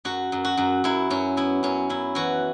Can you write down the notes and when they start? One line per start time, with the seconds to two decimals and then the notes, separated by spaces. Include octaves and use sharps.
0.05 F#2 F#4
0.32 F#2
0.45 F#4
0.57 F#2
0.84 F#2 E4
1.10 F#2 C#4
1.37 B3 E4
1.63 F#2 C#4
1.89 F#2 E4
2.15 E3 F#4